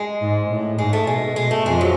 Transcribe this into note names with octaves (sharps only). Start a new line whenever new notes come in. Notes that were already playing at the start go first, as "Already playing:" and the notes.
Already playing: G#3
G#2
A2
G#2 G#3
A3
B2 G#3
B2 G#3
A3
F2 F3 G#3
F#3